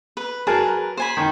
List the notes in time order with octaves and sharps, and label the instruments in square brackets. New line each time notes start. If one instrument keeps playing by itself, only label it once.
[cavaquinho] B4
[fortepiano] F#3 A#4 [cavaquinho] G#4 B4 A5
[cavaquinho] C5 G#5 B5
[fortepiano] D#3